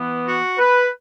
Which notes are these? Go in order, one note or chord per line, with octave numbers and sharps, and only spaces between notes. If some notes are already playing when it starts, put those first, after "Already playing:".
Already playing: E3 B3
F#4
B4